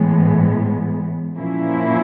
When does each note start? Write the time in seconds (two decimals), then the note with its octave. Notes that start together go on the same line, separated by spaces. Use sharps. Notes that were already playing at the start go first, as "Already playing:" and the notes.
Already playing: A2 E3 G#3 B3
1.35 A#2 F3 A#3 C#4 E4